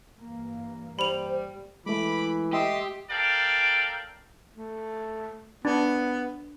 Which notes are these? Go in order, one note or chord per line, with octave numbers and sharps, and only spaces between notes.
G2 E3 A#3
G3 C5 B5 F7
E3 G#3 A3 B5 D6
G4 D#5 E5 C6
A4 A#4 D5 F5 G5
A3
B3 D4